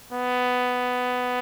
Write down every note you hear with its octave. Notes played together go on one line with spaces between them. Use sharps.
B3